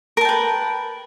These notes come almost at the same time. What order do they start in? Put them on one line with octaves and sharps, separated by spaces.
A#4 A5 G5 B4